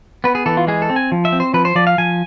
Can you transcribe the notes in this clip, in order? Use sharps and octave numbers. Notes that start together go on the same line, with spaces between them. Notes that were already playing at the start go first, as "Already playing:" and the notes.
B3 B4
G#4
E3 A4
F4
G#3 G#4
A4
C4
G#5
F3
E5
C4
C5
F3 B4
C5
F3 D5
F5
F3 G#5